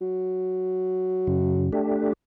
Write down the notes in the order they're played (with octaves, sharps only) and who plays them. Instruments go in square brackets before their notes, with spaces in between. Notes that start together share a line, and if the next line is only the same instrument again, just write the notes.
[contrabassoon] F#3
[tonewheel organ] F#2 C#3
A3 D4 G4